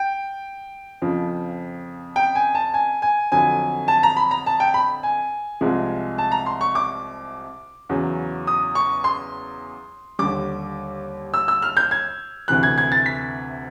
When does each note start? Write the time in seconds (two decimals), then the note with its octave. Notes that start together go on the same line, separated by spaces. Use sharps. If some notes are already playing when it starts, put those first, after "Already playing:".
Already playing: G5
1.02 F2 C#3 F3
2.16 G5
2.35 G#5
2.55 A5
2.74 G#5
3.02 G#5
3.32 F2 D3 F#3 G#5
3.88 A5
4.03 A#5
4.17 B5
4.31 A#5
4.46 A5
4.60 G5
4.74 B5
5.03 G#5
5.61 C2 C3 F3 G#3
6.18 A5
6.32 A#5
6.46 C6
6.61 C#6
6.75 D6
7.89 E2 C#3 F#3
8.47 D#6
8.75 C#6
9.04 C6
10.19 D#2 D3 G3 D6
11.34 E6
11.48 E6
11.62 F6
11.77 G6
11.91 G#6
12.48 D2 C3 E3 F#6
12.63 G#6
12.78 G#6
12.92 A6
13.06 B6